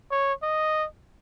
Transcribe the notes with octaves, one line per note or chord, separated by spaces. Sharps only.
C#5
D#5